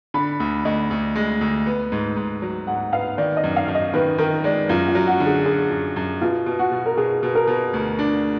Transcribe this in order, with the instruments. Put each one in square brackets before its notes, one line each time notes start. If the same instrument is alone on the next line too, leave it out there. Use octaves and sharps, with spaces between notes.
[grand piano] D3 [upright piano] B5
[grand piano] D2
[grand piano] D2 [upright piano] D#5
[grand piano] D2
G#3
D2
B3
G#2
G#2
F#3
[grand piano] G#2 [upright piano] F#5
[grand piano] B3 [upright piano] F5
[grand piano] D#3 [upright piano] D5
[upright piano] D#5
[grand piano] F#2
[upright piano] F5
[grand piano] F#2
[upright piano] D#5
[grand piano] D#3 [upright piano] B4
[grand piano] D#3 [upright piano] A#4
[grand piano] G#3 [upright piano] D5
[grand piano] F#2 [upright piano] F4
[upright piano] F4
[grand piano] F#3
[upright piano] F#4
[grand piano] D3
[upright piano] G#4
[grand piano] D3 [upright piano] G#4
[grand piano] F#2
F#2
[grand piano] B2 [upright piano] F4
[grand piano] B2
[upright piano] F#4
[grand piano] B2
[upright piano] A#4
[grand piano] B2 [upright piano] G#4
[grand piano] B2
[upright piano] A#4
[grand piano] B2
D2
D4